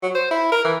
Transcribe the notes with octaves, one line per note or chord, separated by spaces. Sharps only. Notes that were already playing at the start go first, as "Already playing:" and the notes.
F#3
C5
E4
A#4
E3